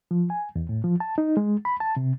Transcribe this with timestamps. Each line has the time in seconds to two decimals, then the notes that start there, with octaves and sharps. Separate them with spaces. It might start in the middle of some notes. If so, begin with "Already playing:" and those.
0.11 F3
0.30 G#5
0.56 E2
0.69 A2
0.84 F3
1.00 A5
1.18 D#4
1.37 G#3
1.65 B5
1.80 A5
1.96 C3